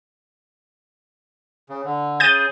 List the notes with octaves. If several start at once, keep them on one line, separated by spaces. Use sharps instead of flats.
C#3
D3
C#3 G#4 G6 A6 D#7